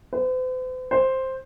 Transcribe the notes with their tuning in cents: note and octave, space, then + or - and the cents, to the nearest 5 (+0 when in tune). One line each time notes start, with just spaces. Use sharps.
C5 -45
C5 +5